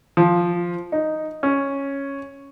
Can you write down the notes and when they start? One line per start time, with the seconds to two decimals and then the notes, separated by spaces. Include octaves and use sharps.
0.17 F3
0.92 D#4
1.43 C#4